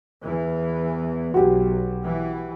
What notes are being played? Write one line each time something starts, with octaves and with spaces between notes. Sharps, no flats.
E2 E3
B1 F#4 G4
E3